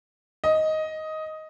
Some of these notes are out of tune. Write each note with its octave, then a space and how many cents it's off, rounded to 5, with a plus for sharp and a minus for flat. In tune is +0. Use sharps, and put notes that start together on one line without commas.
D#5 +10